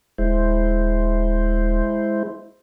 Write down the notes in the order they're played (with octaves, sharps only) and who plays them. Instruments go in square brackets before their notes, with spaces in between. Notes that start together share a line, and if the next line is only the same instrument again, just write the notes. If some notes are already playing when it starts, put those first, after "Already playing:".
[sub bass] D#1 [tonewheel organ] G#3 E4 C5